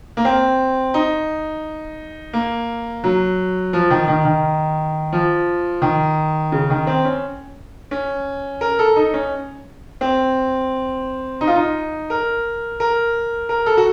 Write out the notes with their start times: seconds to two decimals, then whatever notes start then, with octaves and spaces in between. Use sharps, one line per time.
0.17 A#3
0.25 C4
0.94 D#4
2.33 A#3
3.04 F#3
3.73 F3
3.90 D#3
4.08 D#3
4.25 D#3
5.13 F3
5.82 D#3
6.52 C#3
6.70 D#3
6.87 C4
7.05 C#4
7.91 C#4
8.61 A#4
8.79 A4
8.96 D#4
9.14 C#4
10.01 C4
11.41 D#4
11.47 F4
11.55 D#4
12.10 A#4
12.80 A#4
13.49 A#4
13.66 A4
13.77 F#4